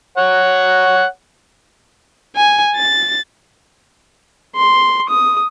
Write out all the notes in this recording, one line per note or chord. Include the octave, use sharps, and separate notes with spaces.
C#5 F#5
G#5
A6
C6
D#6